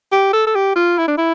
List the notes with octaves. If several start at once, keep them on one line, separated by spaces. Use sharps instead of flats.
G4
A4
A4
G4
F4
E4
D4
E4